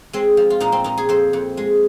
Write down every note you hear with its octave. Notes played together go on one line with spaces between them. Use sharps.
G#3 C4
F3
F4
A#2 D#4
C4
A#2 D#4
G#4
F2 C5
F2
G#3